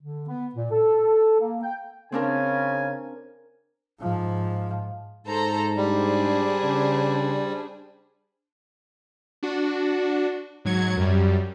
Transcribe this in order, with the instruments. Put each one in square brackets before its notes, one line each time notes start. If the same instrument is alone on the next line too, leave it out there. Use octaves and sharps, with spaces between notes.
[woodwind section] D3
B3
A#2
A4
A#3
G5
[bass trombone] C#3 [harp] C4 D4 A#4 [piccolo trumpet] G#5
[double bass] G#2 F3
[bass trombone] G#2 [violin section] A4 C5 A#5
[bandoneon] G3 [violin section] D4 G#4 C5
[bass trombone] C#3
[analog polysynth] D4 F#4
G#2 F#3 G#6 C#7
F#2 G3